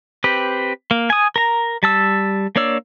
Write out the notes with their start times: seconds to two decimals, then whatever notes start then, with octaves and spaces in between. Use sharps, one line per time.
0.24 C4 G4 B4
0.91 A#3
1.10 G#5 D#6
1.36 A#4 A#5
1.83 G3 A5 E6
2.56 A#3 D4 C#5 D5 E6